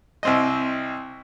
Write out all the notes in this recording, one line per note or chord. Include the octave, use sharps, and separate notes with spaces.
C2 C4 D#5